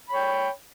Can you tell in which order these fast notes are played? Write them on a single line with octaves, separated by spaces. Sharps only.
B5 C#5 G5